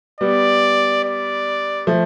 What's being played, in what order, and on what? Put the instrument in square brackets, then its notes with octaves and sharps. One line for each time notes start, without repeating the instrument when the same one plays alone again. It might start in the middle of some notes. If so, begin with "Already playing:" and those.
[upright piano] G3 B3 [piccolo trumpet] D5
[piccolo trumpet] D5
[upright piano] F3 A3